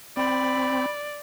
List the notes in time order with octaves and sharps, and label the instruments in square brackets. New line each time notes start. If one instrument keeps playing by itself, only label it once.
[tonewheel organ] C4 [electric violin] D5 [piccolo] B5